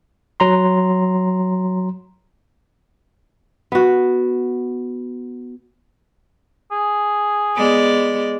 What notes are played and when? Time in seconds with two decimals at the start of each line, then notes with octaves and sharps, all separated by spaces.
0.40 F#3 A#5 C6
3.72 B3 F#4
6.72 G#4
7.56 G#3 B3 D5